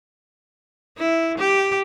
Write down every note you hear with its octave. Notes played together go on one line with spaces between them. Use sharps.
E4
G4